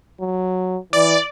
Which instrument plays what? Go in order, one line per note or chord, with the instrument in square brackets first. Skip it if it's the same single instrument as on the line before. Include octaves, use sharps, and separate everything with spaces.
[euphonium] F#3
[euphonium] E3 [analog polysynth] D5